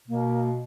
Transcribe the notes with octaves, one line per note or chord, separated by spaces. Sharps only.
B2 A#3